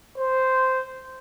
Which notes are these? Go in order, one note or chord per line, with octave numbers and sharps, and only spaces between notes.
C5